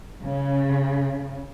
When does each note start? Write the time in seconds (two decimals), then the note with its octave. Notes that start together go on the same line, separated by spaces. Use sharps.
0.22 C#3